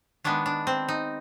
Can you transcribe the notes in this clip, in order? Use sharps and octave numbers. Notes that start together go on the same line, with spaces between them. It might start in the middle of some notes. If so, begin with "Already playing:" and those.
D#3 G#3 B3 D4
D4
C4
D#4